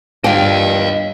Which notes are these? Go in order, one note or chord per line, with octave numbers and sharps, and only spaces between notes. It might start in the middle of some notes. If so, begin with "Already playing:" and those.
G2 F4 D5 D#5 F5 G5